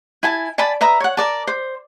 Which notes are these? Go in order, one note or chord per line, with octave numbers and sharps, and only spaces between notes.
E4 G#5 A5
D5 G#5 A5 B5
B4 E5 A#5 D#6
C#5 F#5
A#4 D5 A5
C5